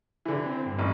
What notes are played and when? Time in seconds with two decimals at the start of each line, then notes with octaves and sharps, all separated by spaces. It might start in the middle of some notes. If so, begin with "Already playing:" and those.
0.25 D3 E3
0.45 C4
0.66 G2
0.79 A1